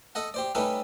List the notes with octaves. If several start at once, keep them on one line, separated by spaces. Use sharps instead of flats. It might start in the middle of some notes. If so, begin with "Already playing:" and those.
A4 D#5 F#5
G4 C5 D5
G3 A3 C#4 D#4 A4 B4